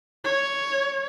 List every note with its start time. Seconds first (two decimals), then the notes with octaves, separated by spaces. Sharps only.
0.24 C#5